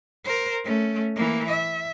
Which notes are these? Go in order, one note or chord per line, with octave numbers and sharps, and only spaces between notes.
A#4 C5
A3 C#4
E3 A#3
E5